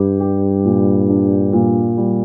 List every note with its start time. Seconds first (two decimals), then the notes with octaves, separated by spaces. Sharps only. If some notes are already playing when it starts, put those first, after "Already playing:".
Already playing: G2 G3 G4
0.20 G4
0.65 A#2
1.09 D4
1.53 A#2
1.97 G3